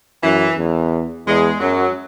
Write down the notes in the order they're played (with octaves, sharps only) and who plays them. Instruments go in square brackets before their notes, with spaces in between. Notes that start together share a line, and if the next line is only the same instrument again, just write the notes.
[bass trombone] F#2 [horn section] E3
[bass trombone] E2
[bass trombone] E2 [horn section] G#3
[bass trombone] F#2 [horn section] F#3